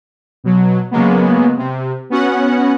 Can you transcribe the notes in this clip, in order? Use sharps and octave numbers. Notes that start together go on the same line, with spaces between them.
B2 F#3
C#3 F#3 G#3 A#3 B3
C3
B3 C#4 F#4 F#5